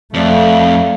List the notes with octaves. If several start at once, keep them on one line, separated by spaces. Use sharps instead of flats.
F2 A3 A#3 D5 F#5